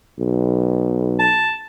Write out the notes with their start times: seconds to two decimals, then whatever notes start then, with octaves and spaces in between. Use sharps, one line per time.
0.20 B1
1.19 A5